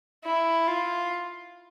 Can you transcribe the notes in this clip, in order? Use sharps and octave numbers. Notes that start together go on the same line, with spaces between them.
E4
F4